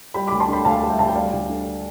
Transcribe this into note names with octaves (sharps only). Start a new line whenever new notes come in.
G3 G5 B5
D2 B5 D6
A5 C6
D3 G5 B5
D2 F5 A5
G3
E5 G5
D2 A5
G5
G3 D5 F5
D2
D3